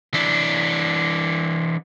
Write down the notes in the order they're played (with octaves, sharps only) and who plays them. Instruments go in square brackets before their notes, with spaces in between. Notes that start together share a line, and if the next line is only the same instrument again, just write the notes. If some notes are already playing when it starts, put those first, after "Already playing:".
[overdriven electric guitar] E3 D4